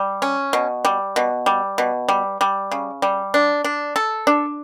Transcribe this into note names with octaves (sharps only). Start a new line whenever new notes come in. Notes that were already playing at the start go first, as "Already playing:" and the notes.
Already playing: G3
C#4
B2
G3
B2
G3
B2
G3
G3
C#3
G3
D4
D4
A4
D4